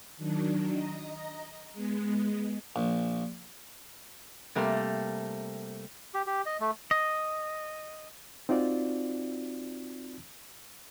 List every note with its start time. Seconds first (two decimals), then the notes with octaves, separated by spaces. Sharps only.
0.17 D#3 F#3 D4
0.72 D#5 A#5
1.73 G#3 B3
2.76 A#1
4.55 C3 G3 A3 A#3
6.14 G4
6.27 G4
6.46 D#5
6.60 A3
6.91 D#5
8.49 C4 D#4 F4 F#4 D5